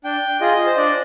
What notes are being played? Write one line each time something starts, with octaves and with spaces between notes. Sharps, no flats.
D4 G5
F4 G#4 D#5
C5
D4 D5